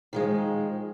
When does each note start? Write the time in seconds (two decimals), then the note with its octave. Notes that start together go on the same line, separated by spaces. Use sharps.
0.13 D#3 F3 G#3